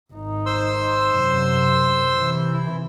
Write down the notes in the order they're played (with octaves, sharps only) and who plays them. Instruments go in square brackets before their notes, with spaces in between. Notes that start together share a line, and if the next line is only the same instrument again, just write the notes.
[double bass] G#1 D#4
[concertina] C5 C6 E6
[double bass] F#2 C3
C3 E3
[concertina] E4